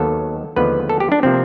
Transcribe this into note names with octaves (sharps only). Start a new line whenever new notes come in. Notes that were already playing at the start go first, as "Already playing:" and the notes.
Already playing: D#2 D#3 F#3 B3 A4
D#2 D3 F3 G#3 B3 B4
A4
G4
D4
C3 F3 A#3 C4